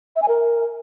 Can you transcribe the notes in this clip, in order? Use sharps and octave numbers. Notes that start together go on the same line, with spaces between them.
E5
G#5
A#4